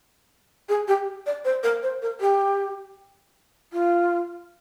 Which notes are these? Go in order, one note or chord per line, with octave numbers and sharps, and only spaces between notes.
G#4
G4
D5
C5
A#4
C5
A#4
G4
F4